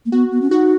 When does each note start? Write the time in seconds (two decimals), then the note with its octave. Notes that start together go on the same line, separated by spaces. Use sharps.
0.06 A#3
0.12 B3 F#4
0.31 B3
0.42 C#4
0.50 D#4 F#4